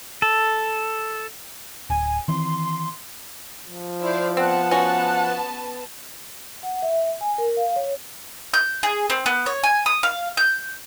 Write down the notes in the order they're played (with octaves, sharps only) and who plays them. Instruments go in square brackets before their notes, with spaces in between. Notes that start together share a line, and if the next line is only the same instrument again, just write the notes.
[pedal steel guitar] A4
[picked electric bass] D1 [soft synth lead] G#5
[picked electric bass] D#3 E3 C4 [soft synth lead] C6
[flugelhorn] F3
[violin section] E4 D5 F5 [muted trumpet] C5
[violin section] B3 A5 [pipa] C4 [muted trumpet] F#5
[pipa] C#4 F#4
[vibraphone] F#5
E5
G#5
A#4
F5
C#5
[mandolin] G6
G#4
C4
B3
C#5
G#5
D#6
F5
G6